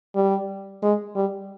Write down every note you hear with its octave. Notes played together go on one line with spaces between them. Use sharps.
G3
G#3
G3